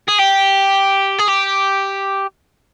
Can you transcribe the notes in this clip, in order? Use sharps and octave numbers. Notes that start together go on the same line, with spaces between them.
G#4
G4
G#4
G4